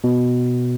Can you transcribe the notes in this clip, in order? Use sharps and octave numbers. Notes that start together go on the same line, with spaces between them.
B2